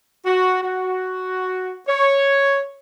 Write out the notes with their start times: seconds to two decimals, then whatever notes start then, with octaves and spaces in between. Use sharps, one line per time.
0.26 F#4
0.63 F#4
1.88 C#5